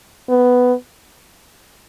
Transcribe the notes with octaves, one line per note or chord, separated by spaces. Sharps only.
B3